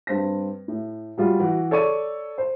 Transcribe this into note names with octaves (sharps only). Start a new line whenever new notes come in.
G2 C4 A#6
A2
F#3 G3 F4
E3 F#4
A4 C#5 D5 C#6 D#7
C5